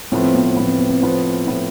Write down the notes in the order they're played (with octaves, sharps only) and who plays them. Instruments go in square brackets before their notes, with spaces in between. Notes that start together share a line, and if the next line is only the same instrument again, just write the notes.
[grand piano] A2 F3 B3 [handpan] C4
[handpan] C4
B3
C4
[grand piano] A2 F3 B3 [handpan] C4
[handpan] C4
B3
C4
[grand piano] A2 F3 B3
A2 F3 B3